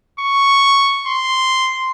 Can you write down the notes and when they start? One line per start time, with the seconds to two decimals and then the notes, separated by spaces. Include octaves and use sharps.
0.20 C#6
1.07 C6